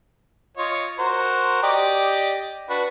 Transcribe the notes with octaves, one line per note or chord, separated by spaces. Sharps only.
F4 C#5 D#5
F#4 A#4 C5
G4 D5 D#5
D4 F#4 B4